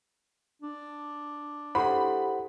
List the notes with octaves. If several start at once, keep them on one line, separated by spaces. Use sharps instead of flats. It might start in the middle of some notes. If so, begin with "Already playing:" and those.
D4
E4 G4 A4 C5 F#5 B5 C6